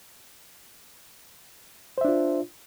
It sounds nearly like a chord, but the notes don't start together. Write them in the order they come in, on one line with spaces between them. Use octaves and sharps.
C5 E5 D4 F4